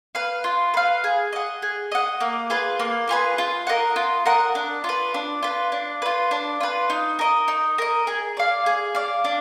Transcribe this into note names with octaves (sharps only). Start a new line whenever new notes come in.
B4 F5
F4
B4 F5
G#4
D#5 F#5
G#4
D#5 F#5
A#3
F4 G#4 B4
A#3
F4 G#4 B4
F4
A#4 D#5 F#5
F4
A#4 D#5 F#5
D4
F4 B4
D4
F4 B4
D4
F4 B4
D4
F4 B4
D#4
A#4 D#5
D#4
A#4 D#5
G#4
D5 F5
G#4
D5 F5
D4